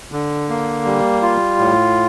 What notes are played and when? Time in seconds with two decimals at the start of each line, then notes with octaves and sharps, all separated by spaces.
0.12 D3
0.49 A#3
0.85 G3
1.22 F4
1.59 A2